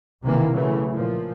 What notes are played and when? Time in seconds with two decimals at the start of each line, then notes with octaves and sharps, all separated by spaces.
0.23 B1 C3 D#3 E3 A#3
0.54 C#3 E3 F#3 A3
0.91 A#2 F3